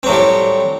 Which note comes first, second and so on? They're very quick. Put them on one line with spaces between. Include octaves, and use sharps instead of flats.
C4 F#3 A2 G3